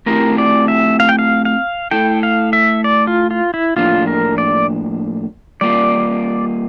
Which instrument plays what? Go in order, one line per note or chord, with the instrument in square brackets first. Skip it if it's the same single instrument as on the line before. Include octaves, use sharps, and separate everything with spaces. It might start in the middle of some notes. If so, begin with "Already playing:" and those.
[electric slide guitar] A3 C4 E4 G4 [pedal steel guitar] A#4
[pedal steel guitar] D5
E5
F5
G5
F5
F5
[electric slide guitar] A3 E4 A4 [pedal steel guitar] G5
[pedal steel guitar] F5
E5
D5
F4
F4
E4
[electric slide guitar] A2 F3 A#3 D4 [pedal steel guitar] F4
[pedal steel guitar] A#4
D5
[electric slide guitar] G3 A#3 F4 [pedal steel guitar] D5